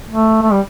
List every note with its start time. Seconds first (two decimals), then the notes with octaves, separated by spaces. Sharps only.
0.10 A3
0.43 A3
0.52 G3